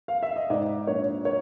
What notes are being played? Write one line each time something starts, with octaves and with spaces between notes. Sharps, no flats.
F5
E5
D#5
G#2 D5
A#1 C#5
C#5